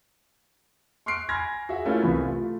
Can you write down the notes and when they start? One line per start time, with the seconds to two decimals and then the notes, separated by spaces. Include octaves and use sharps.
1.06 C6 C#6 F6 F#6 C7 D7
1.29 G#5 B5 C6 F6 G#6 A#6
1.69 F#4 G#4 E5
1.85 A3 A#3 C#4 E4 F4 A#4
2.02 C2 E3 B3 B5
2.23 A3 F4